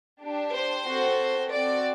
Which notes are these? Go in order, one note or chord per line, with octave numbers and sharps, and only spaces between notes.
D4 G4
C5
C4 F#4 A4
C4 F#4 A4 D5